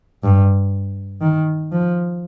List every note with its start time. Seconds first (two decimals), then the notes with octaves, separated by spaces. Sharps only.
0.23 G2
1.21 D#3
1.72 F3